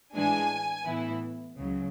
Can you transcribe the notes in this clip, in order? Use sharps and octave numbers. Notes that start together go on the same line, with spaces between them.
A2 E3 G#3 D4 G#5
A2 E3 B3 E4
C#2 C#3 F#3